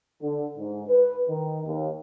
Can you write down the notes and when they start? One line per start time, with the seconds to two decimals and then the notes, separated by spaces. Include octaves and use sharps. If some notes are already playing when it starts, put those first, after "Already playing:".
0.22 D3
0.58 G#2
0.88 B4
1.29 D#3
1.67 D#2